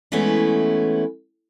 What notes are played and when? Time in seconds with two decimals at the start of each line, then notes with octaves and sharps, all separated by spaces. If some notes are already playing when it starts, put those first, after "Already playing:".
0.12 E3 G#3 A3 B3 C#4 E4